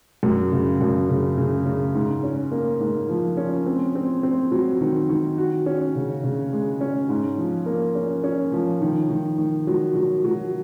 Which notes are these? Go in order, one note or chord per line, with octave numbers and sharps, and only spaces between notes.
F#2
C#3
F#2
C#3
C#3
C#3
G#2
C#4
A#3
G#2
F3
C#4
C4
C4
C4
F#3
D#3
D#3
F#4
C#4
C#3
C#3
G#3
C#4
G#2
F3
A#3
C#4
C#4
F3
D#3
D#3
D#3
F#3
F#3
F#3